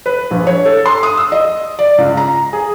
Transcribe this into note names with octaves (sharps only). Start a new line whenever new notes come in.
B4
A#1
C#5
A4
C6
D#6
E6
D#5
D5
C#2
A#5
G#4